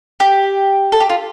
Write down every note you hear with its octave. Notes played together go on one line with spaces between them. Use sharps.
G4
A4
G4
F4